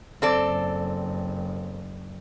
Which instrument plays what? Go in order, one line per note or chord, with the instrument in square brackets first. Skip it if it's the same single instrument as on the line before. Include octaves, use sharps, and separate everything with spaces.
[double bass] F#1 [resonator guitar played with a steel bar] C4 A4 D5